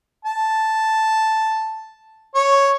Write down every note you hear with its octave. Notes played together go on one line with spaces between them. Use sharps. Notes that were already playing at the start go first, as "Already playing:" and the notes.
A5
C#5